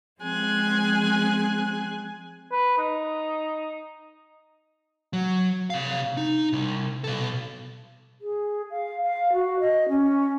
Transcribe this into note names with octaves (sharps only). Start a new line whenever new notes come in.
F3 G#3 C4 G#4 G#5 F#6
B4
D#4
F#3
C3 F5
D#4
C2
B2 A4
G#4
F5
F5
F#4
D#5
C#4